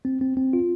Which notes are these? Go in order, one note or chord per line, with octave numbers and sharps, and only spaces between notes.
C4
C4
C4
F4